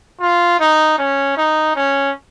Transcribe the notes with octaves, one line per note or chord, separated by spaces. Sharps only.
F4
D#4
C#4
D#4
C#4